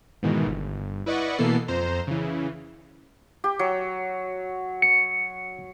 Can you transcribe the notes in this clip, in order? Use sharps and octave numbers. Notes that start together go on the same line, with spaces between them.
G#2 B2 D#3 E3
G1
E4 B4 D5 D#5 F#5 C#6
B2 E3 A#3 B3 A4 C7
F2 C5 A#5
C#3 E3
G4
F#3
C#7